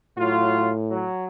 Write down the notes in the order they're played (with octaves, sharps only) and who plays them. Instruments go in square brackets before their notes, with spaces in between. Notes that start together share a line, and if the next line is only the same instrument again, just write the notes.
[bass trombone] A2 [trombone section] F#3 F4
[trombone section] F#3